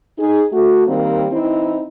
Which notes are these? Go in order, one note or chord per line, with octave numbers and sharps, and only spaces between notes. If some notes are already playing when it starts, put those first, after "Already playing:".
D#4 G#4
A3 F#4
D#3 G3 A#3 C4
E3 C4 D#4 E4